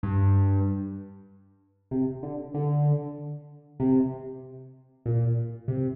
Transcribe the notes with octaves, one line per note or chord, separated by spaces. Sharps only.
G2
C3
D3
D3
C3
A#2
C3